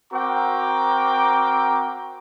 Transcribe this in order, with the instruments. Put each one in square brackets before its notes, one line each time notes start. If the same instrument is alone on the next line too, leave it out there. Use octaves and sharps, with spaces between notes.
[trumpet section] C4 F#4 A#4 G5 A#5 D6